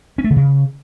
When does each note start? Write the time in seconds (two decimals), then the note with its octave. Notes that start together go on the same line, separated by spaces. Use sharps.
0.18 C#4
0.24 A3
0.30 D3
0.36 C#3